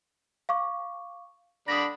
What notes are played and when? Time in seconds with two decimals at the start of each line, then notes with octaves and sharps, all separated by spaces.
0.49 F5 C#6 D6
1.68 D3 D4 B5 D#6 A#6